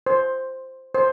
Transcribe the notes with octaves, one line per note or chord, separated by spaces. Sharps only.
C5
C5